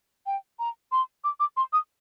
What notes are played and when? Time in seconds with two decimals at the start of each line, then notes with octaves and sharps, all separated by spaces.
0.26 G5
0.59 A#5
0.92 C6
1.24 D6
1.40 D6
1.57 C6
1.73 D#6